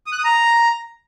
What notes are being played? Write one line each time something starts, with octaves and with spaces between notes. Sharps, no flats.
D#6
F#6
D#6
A#5